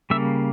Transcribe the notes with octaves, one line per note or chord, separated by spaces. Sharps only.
C#3 G3 A#3 E5